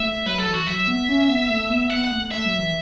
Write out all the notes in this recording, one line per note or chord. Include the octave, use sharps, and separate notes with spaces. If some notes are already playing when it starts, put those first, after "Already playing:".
Already playing: A3 E5
F#3 B4
A4
E3
F#4
F#3 E5
B3
C#4
B3
A3
B3
B3 F#5
F#5
A3
A3 E5
F#3
E3